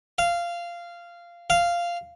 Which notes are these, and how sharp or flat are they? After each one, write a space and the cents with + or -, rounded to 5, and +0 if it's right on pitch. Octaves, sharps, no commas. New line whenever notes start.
F5 -15
F5 -10